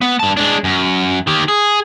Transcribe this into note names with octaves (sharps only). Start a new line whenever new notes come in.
B3
G2 A5
G#3 D4
F#2
D#3 G4
G#4